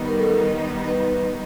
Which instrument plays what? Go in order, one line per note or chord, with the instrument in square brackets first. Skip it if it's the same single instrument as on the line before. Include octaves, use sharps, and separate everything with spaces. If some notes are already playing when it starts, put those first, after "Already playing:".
Already playing: [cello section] D#3 G3 B3 D#4
[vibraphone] A#4
A4
A#4
B4